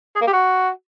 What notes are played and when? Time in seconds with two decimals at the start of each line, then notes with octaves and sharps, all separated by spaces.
0.16 G#4
0.21 A#3
0.27 G4
0.33 F#4